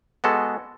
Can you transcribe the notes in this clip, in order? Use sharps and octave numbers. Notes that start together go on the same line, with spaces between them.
G#3 B3 F#4 A4